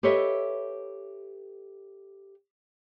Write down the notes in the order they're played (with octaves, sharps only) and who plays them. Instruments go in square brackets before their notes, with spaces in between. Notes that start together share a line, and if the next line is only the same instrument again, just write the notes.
[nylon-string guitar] G4 A4 B4 C#5 D#5 E5